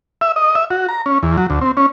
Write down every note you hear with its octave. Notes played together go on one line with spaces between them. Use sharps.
E5
D#5
E5
F#4
A#5
C#4
E2
F#3
D2
C4
C#4